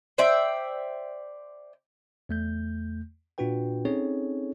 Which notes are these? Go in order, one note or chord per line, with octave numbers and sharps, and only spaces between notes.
C5 D5 E5 G5
E2 A3 G6
A#2 D4 F4 F#4 B4 G5
C4 C#4 D#4 G#4 A4 C#5